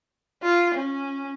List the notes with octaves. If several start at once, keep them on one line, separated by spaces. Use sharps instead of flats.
F4
C#4